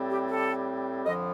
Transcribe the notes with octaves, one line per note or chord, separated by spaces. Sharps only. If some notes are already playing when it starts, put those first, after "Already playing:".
Already playing: A2 G3 C4
G4
A4
F2 D3 F3 D#5